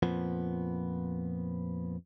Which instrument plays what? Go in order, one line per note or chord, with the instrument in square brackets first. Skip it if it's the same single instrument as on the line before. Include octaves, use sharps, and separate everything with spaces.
[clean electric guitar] F2 A#2 F3 B3